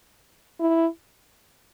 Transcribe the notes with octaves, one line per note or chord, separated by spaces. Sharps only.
E4